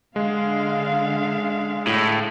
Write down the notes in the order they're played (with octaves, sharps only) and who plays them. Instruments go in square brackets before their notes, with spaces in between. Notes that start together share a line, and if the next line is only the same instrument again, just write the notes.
[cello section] D3 F5 [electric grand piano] G#3
[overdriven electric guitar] A2